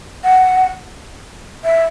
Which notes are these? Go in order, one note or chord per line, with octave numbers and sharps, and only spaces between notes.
F#5
E5